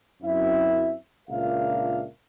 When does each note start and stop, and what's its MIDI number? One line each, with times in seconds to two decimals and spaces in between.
0.22 0.93 42
0.22 0.93 60
0.22 0.93 64
0.22 0.93 76
1.29 2.04 37
1.29 2.04 46
1.29 2.04 62
1.29 2.04 70
1.29 2.04 76
1.29 2.04 77